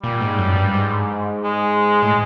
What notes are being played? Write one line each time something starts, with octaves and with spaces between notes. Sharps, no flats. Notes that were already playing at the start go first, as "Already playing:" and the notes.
A#2 G3
G#2
F#2
G2
G#2
G#3
A2